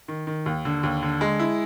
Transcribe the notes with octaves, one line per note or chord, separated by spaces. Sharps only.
D#3
D#3
D#2
D3
D#2
D3
G#3
E4